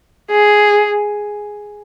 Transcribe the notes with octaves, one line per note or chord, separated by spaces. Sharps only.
G#4